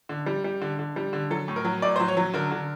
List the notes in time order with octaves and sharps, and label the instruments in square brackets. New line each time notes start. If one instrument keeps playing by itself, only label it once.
[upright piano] D3
G3
G3
D3
D3
G3
D3
F#3 A4
A2
A#4
F#3
A2 D5
F#3 C5
C#5
F#3
D3 A#4
D3